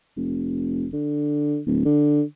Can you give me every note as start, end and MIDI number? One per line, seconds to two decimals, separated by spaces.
0.17 0.87 29
0.93 1.59 50
1.67 1.83 26
1.85 2.22 50